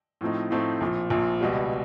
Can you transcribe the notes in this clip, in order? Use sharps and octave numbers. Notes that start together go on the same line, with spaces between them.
A2 F3 A3 C4 D#4
A2 F3 A3 C4 D#4
A#1 A#2 F3
A#1 A#2 F3
C#2 B2 G3